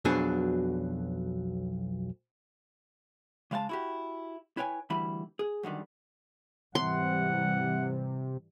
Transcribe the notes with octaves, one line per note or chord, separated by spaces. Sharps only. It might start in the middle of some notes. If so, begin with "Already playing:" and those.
B1 F2 B2 F#3 D4 G#4
C#3 G#3 F5 F#5 A5
E4 F#4 G4
E4 B4 C#5 G5 G#5
D2 E3 G3 E4 B5
G#4
F#2 D3 D#3 G3
G#2 C3 E3 G3 F#5 C6